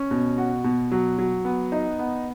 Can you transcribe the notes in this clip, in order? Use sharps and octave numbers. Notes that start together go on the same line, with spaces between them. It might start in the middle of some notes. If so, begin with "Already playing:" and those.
Already playing: C#4
B2
F#4
B2
F#3
F#3
B3
D#4
B3